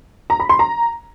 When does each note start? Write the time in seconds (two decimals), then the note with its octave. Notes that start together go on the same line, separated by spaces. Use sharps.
0.30 A#5
0.40 B5
0.49 C6
0.59 A#5